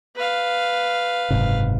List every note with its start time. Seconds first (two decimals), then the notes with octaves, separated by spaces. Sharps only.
0.16 B4 F5
1.30 F#1 G#2 C3